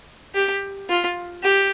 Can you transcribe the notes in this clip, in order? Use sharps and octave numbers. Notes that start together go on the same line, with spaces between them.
G4
F4
G4